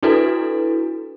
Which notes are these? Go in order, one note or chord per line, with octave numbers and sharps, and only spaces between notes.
D4 E4 F#4 A4 B4